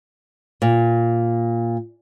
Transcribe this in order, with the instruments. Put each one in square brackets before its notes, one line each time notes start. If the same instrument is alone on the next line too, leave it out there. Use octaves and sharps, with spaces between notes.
[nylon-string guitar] A#2